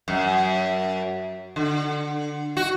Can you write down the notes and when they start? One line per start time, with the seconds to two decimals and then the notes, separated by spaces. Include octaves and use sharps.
0.08 F#2
1.56 D3
2.57 F#4